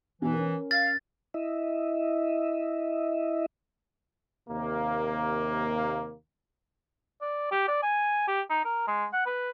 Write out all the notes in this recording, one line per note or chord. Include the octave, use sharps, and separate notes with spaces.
B2 E3 D#4
C#4 A#4
F5 A6
E4 D#5 E5
D#2 C3 A#3
D5
G4
D5
G#5
G4
D#4
A#4
G#3
F#5
B4